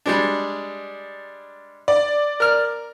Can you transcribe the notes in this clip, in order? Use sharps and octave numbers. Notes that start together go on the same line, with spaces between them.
G3 G#3 D4
D5
A#4 F6